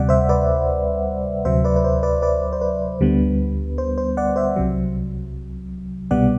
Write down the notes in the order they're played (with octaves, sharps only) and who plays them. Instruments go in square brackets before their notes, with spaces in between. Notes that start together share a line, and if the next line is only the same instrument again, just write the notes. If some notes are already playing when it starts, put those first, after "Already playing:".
Already playing: [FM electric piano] D2 C3 G3 D5 F#5
C5 E5
B4 D5
D2 C3 F#3 C5 E5
B4 D5
B4
C5
B4 D5
B4 D5
C5
B4
D2 D3 G3 B3
C5
C5
D5 F#5
C5 E5
C2 C3 F#3
C2 B2 G3 B3 D5 F#5